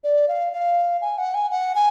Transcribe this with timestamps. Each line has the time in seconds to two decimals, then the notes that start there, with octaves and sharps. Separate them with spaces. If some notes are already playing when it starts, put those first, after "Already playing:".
0.04 D5
0.28 F5
0.53 F5
1.02 G#5
1.18 F#5
1.34 G#5
1.51 F#5
1.75 G#5